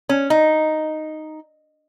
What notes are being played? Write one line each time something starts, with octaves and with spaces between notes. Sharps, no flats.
C#4
D#4